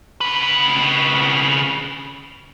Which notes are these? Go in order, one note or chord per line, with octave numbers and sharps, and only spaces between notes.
C#3 B4